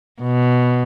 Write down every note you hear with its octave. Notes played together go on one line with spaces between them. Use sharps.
B2